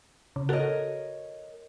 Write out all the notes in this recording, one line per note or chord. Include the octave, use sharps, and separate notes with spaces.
C#3
F#4 A4 A#4 C#5 D#5